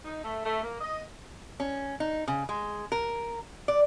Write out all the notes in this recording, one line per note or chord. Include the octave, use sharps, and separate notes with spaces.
D#4
A3
A3
A#3
D#5
C#4
D#4
C#3
G#3
A#4
D5